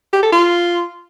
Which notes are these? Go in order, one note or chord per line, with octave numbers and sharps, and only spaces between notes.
G4
A4
F4